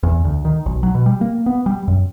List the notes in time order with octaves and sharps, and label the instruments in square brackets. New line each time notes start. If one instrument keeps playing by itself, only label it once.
[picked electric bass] E2
D2
D#3
B1
F#3
B2
G3
A#3
B3
G3
F#2